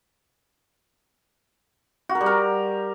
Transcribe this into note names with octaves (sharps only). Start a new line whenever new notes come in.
F#4
A#4
G3
A#4